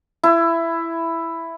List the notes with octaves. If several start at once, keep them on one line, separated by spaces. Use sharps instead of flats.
E4